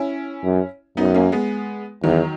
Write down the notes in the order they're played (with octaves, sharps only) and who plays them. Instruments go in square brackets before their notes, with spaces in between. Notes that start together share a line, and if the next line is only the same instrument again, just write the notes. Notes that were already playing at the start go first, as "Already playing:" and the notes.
Already playing: [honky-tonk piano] C#4 E4
[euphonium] F#2
[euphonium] F#2 [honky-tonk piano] B3 D#4
[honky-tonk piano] A#3 C#4
G#3 B3
[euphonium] E2 [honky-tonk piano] D#3 F#3